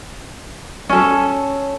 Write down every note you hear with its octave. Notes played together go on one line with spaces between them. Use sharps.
C#4 A4